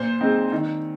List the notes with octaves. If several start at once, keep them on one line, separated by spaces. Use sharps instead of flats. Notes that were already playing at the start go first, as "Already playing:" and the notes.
Already playing: A#2 C5
G#3 C4 D#4
D#3